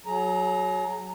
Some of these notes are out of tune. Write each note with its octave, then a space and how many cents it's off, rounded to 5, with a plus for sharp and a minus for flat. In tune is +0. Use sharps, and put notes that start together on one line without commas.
F#3 +0 G#4 +40 A#5 +0